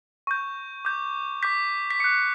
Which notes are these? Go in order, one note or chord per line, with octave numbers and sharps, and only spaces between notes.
C#6 G6
D6 G6
D6 G6 B6
B6
D6 F#6 C#7